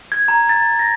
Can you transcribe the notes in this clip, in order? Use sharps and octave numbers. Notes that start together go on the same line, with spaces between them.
G#6
A#5
A6
A#6